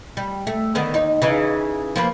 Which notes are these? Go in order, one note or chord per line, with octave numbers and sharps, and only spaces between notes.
G3
A3
D3 D#3 B3
D#2 D#4
C#3 E3 D#4
F3 A#3 B4